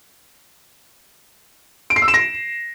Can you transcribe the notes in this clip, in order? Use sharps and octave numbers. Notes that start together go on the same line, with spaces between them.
D7
C7
E6
E7
A#6